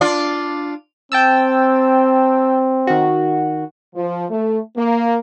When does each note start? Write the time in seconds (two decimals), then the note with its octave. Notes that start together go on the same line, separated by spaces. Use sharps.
0.01 D4 F4 D5
1.12 C4 G5 A5 E6
2.87 D#3 F#4
3.95 F3
4.30 A3
4.77 A#3